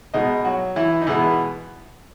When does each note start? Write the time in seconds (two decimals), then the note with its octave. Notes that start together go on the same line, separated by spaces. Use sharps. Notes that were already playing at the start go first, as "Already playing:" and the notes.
0.14 B2 G#3 B3 D#4 D#5
0.45 F#3 F#4
0.76 E3 E4
1.02 D#4
1.07 B2 E3 G#3 B3 E4